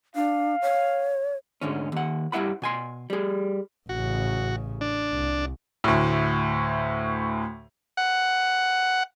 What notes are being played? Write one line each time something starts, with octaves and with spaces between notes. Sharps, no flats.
D4 F5
C#5
D2 G#2 D3 C#4
D#2 F#5
G2 G3 E4 E5 F#5 B5
B2 G#5 C6
G3 G#4
A1 C#3 F#4
D4
C2
D2 A2
F#5